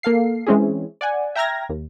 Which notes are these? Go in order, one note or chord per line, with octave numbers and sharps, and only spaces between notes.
A#3 A4 F5 C7
E3 G#3 C4 C#4 E4 G#4
D5 F#5 G#5
E5 G5 A#5 F6 G#6 A#6
D#2